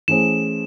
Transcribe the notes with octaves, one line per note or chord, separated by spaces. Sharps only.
E3 A3 C#4 G#4 C5 E7